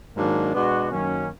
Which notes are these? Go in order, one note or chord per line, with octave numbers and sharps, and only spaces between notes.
G#2 D#3 F#3 A#3 D4
B2 G#3 B3 D4 F#4
F#2 D#3 F#3 A#3 C#4